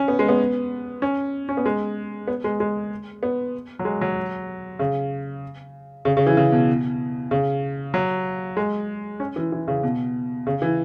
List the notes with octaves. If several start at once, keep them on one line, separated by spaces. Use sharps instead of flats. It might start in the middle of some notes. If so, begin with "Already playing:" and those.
Already playing: C#4
B3
G#3
B3
C#4
C#4
B3
G#3
B3
G#3
G#3
B3
F#3
G#3
F#3
C#3
C#3
C#3
E3
C#3
B2
C#3
F#3
G#3
C#4
E3
E3
C#3
B2
C#3
E3